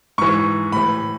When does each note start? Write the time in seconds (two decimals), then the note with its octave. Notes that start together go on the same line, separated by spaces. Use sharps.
0.18 G#2 E3 C#6
0.72 A2 E3 B5